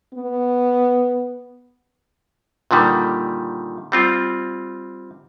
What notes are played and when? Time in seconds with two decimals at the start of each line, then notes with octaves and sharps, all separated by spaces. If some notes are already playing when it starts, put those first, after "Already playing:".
0.14 B3
2.71 A#2 D3 D#3 G3
3.92 G3 C4 F4